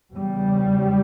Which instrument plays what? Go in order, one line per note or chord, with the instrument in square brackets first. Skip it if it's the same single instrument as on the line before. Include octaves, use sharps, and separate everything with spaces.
[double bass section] E2 C#3 G3